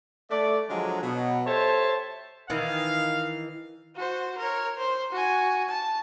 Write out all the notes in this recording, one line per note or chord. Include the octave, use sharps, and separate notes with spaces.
A3 D5
D3 F3 F#3 G#3
B2 F#3
G4 A4 C5 C#5 E5 A5
D#3 E3 F5
F#4 C5
A#4 C#5
C5
F#4 G#5
A5